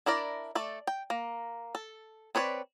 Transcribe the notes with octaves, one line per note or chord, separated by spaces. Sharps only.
D4 E4 A#4 D5
A3 A4 D5
G5
A#3
A4
C4 B4 C#5 D5